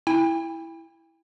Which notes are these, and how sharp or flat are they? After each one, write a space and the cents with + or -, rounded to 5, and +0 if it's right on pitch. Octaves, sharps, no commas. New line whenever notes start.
E4 +0 G5 +40